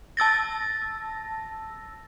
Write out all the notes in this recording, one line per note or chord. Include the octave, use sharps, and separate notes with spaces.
A5 E6 A6 A#6